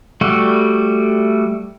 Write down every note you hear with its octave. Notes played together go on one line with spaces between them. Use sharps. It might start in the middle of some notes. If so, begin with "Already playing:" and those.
G3 A3 F#4